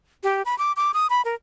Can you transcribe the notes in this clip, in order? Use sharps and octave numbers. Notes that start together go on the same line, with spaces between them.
G4
B5
D6
D6
D#6
B5
A#4